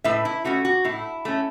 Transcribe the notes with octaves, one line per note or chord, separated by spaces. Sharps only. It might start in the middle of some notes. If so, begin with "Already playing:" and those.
A2 B4 E5
E4
A3 C#4 F#4
F#4
A2 E4
A3 C#4